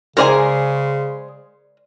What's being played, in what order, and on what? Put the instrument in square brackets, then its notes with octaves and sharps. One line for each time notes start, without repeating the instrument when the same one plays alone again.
[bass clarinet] C#3 [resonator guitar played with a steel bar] G#3 G#4 C5 [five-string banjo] A#4 D5 G#5